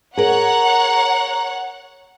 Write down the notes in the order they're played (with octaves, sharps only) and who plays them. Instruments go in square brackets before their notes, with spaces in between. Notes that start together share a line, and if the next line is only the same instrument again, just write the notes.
[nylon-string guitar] G#4 A#4 [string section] C#5 F#5 F#6 [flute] A#5